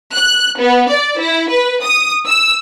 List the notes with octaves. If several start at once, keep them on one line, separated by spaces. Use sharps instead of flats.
F#6
B3
D5
E4
B4
D#6
E6